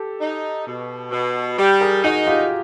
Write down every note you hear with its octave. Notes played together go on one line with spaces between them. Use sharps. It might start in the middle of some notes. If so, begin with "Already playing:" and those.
Already playing: G4 A4
D#4
B2
B2
G3
G#4 A#4
D#4 F#4 G#4
F4 G4